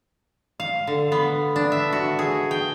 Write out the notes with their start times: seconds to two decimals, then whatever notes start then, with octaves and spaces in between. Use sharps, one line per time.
0.60 F5
0.87 D3
1.12 B3
1.56 D4
1.72 E5
1.93 F#4
2.19 G#4
2.51 G5